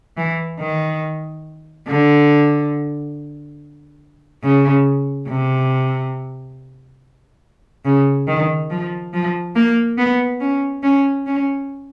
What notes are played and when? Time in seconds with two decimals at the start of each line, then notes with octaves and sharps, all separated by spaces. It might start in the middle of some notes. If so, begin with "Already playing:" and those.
0.17 E3
0.59 D#3
1.87 D3
4.44 C#3
5.28 C3
7.85 C#3
8.27 D#3
8.70 F3
9.13 F3
9.56 A#3
9.98 B3
10.41 C#4
10.83 C#4
11.26 C#4